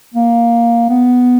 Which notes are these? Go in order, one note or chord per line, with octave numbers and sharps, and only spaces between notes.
A#3
B3